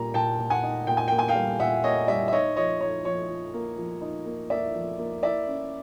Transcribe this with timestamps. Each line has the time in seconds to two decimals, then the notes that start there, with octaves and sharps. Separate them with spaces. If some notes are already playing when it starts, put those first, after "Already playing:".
Already playing: A#2 G3 A#3 A#5
0.14 A#2 G5 A5
0.39 A#2
0.50 F#5 G#5
0.63 D#4
0.87 A#2 G5
0.97 G#5
1.08 A#3 G5
1.19 G#5
1.28 F5 G5
1.35 G3
1.60 A#2 E5 F#5
1.84 A#3 C#5 D#5
2.08 G3 D5 E5
2.28 E5
2.32 D#4 C#5 D#5
2.56 F3 C#5 D#5
2.81 D#4 C#5
3.05 F3 C#5
3.29 F3
3.54 A#3
3.77 F3
4.01 D#4
4.26 A#3
4.50 A#3 D5 E5
4.74 F3
4.99 A#3
5.23 E4 D5 E5
5.47 C#4